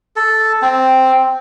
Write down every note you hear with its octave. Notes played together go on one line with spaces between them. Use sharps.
A4
C4